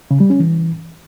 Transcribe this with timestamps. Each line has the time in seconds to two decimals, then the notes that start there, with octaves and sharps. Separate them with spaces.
0.11 C#3
0.20 G3
0.30 C#4
0.40 E3